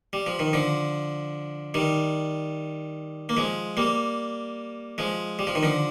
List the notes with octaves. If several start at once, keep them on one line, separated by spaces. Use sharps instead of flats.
G3
F3
D#3
D3 F3
D#3 G3
A#3
F3 G#3
G3 A#3
F3 G#3
G3
F3
D#3
D3 F3